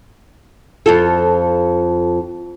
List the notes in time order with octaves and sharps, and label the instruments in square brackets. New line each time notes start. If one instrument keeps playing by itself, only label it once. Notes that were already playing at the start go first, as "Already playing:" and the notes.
[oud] F2 F4 A4